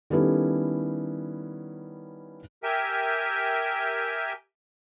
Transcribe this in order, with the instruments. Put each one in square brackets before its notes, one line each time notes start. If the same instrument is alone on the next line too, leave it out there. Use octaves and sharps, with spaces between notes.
[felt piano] D#3 G3 B3 C#4 E4 A4
[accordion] G4 A#4 E5 G5 G#5